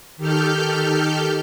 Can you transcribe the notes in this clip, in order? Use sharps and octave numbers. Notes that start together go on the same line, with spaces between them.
D#3 G4 A4 F6 G6